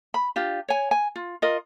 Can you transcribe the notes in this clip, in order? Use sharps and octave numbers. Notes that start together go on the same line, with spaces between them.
B5
D4 F4 G4
C#5 G#5
G#5
F4
F4 A#4 D#5